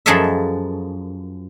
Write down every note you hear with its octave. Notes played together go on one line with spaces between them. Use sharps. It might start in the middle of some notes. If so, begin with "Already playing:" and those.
F#2 F3 G#4 A4 D#5 E5